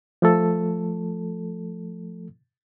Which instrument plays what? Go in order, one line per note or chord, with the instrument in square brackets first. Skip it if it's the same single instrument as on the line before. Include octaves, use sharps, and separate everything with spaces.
[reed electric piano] F3 A3 A4